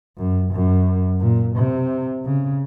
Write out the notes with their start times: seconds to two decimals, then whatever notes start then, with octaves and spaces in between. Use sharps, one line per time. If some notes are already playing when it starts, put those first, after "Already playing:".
0.17 F#2
0.52 F#2
1.21 A#2
1.56 C3
2.25 C#3